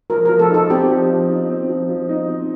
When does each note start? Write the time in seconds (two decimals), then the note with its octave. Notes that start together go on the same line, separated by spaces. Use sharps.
0.10 F3 A#4
0.25 F3 A#4
0.39 A4
0.50 D#4 A4
0.70 C4 G4
0.89 F3
1.09 F3
1.29 D#4
1.50 C4
1.69 F3
1.89 F3
2.09 D#4
2.29 C4